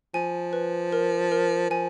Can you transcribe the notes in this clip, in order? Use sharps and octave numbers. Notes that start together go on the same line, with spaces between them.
F3 G#5
B4
A#4
A#4
F3 G#5